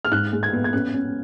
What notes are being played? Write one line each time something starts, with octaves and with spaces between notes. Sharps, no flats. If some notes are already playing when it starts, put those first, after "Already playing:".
F6
G#2 F#6
G#3
G#6
B3
G#6
C#4 F#6
C#4